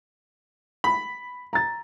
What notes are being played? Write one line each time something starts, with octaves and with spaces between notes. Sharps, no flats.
B5
A#5 A6